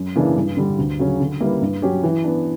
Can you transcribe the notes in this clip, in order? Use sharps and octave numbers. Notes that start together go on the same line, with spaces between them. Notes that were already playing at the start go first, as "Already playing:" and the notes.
Already playing: F#2
C#3 E3 A#3 D4
G2
D3 G3
D2
C#3 F#3 C#4
D3
G3 A#3 E4 B4
G2
F#3 C#4 G4
E3
B3 D4